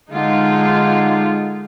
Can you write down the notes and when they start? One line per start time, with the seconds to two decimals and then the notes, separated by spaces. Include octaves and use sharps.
0.11 D3 G#3 D#4 F4